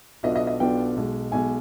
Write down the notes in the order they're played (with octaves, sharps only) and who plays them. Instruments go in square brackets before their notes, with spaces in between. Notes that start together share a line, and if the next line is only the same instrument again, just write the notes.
[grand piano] B1 B2 B3 D4 F4 D#5
D#5
D#5
B1 B2 B3 D4 F4 G5
B1 B2 G#3
B1 B2 G#3 G#5